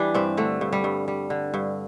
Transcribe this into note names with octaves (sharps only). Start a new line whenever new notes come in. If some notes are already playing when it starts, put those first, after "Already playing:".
Already playing: E3 G3 D4 G4
G2 C4
D3 A3
G2
G3
G2
G3
D3
G2